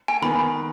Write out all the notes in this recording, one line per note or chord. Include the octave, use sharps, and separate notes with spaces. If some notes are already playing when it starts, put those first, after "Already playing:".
G#5
D#3 B3 B5